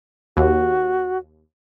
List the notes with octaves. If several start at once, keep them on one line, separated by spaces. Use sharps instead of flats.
D#2 F#4